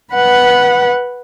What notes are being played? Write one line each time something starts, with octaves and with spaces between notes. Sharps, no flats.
B4 F#5